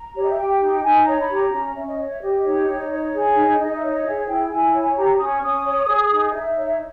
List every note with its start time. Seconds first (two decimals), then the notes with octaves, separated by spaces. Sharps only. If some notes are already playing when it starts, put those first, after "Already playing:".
Already playing: A#5
0.15 G4 C#5
0.23 D#5
0.31 E5
0.38 G4 G5
0.60 D#4
0.83 D#4 G#5
1.06 C#5 A#5
1.20 B5
1.30 G4 A#5
1.52 C#4
1.75 C#4 E5
1.87 D#5
1.98 C#5
2.10 E5
2.21 G4 D#5
2.45 D#4 C#5
2.67 D#4
2.90 C#5
3.13 G#4
3.36 D#4
3.58 D#4 D#5
3.74 E5
3.82 C#5
3.90 D#5
4.04 G#4 E5
4.27 E4 G5
4.50 E4 G#5
4.73 C#5
4.96 G4 A#5
5.19 C#4 D#6
5.31 C#6
5.42 C#4 D#6
5.65 C#5
5.89 G#4
6.11 D#4
6.34 D#4 E5
6.57 C#5